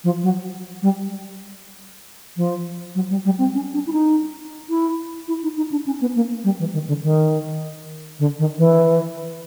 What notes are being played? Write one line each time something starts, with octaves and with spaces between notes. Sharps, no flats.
F3
F#3
G3
F3
F#3
G3
G3
C4
C#4
D4
E4
D#4
E4
E4
D#4
D#4
D4
C#4
B3
A#3
G3
E3
D#3
D3
D#3
D3
D#3
E3